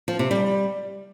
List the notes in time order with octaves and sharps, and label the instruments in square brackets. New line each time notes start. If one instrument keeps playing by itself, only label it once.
[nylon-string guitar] F3
C3
G3